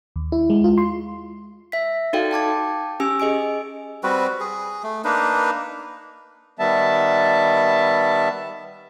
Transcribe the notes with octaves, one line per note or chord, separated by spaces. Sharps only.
D#2
E4
G#3
F4
C6
E5 B6
D#4 F#4 A4 D5 F5 G5
G5 A5 D6 G#6
C#4 G4 G#5 E6
G#4 D#5 G#5 D7
G3 C4 F#4 B4
G#4
A3
A#3 D4 D#4 B4
D#3 G3 B3 E5 A5